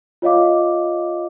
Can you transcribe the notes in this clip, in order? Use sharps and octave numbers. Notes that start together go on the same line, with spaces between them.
F4 C#5 D#5 F5 D6